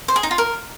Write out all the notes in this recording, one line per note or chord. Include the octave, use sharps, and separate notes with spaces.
C5
G#4
D#4
F4
A#4